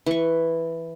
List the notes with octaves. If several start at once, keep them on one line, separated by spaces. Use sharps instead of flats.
E3 C#6